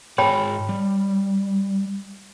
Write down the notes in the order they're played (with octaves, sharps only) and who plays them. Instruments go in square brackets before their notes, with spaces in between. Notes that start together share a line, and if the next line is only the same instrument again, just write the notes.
[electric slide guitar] G#2 G#4 A5 [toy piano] C#5 G5 B5
[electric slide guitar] G3